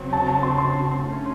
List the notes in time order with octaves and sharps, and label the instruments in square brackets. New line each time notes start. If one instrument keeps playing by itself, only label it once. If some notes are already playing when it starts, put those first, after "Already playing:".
Already playing: [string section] C#3 F#3 C4
[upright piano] A5
A5
C6
C6
[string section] A2 A3 C#4